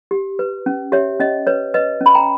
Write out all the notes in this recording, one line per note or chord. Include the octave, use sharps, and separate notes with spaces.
G4
B4
C#4
G4 C#5 E5
C#4 D#5
B4 C#5
B4 D#5
C#4
B5
G5 A#5